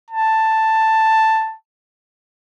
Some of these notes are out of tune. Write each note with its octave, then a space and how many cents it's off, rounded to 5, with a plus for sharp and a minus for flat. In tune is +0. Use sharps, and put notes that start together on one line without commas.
A5 +5